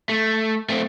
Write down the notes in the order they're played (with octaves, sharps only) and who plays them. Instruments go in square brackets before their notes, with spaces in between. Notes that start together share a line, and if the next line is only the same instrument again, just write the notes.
[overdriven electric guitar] A3
A3 C4